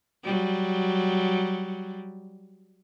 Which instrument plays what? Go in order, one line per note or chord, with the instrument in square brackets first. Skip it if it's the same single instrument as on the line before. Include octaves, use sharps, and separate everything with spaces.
[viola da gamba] F#3 G3